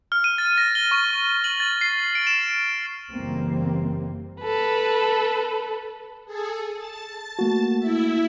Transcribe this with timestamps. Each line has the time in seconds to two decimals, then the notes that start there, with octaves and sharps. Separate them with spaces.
0.12 F6
0.24 D#7
0.38 A6
0.58 A#6
0.75 G7
0.91 C#6
1.44 F#7
1.60 A6
1.81 C7
2.15 D7
2.27 E7
3.12 F#1 E3 G3 A#3 C4
4.41 A4 B4
6.26 G#4 A4
6.77 A5 A6
7.39 A3 A#3 F#4
7.80 E4 E5